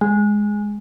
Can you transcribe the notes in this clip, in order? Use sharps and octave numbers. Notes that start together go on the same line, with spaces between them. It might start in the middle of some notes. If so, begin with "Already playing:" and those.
G#3